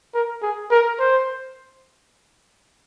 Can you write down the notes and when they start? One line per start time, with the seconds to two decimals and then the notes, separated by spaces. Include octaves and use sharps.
0.14 A#4
0.42 G#4
0.71 A#4
0.99 C5